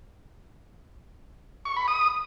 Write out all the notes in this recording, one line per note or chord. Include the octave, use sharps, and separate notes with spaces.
C#6
B5
D#6